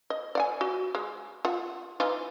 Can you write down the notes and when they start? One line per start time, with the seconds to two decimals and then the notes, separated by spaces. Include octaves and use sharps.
0.10 D#5
0.35 D5 F#5 G#5
0.61 F#4
0.95 G#3
1.45 F4 F#5
2.00 E3 D#4 F4